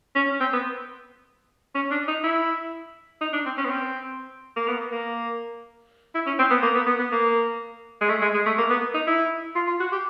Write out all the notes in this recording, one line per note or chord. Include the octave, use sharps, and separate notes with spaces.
C#4
C4
B3
C#4
D4
D#4
E4
D#4
D4
C4
C#4
B3
C4
A#3
B3
A#3
E4
C#4
C4
B3
A#3
B3
B3
B3
A#3
G#3
A3
G#3
G#3
A3
A#3
B3
D#4
E4
F4
F4
F#4
G4